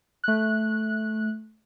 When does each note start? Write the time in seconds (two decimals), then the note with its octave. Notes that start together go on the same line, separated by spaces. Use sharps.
0.24 A3 F#6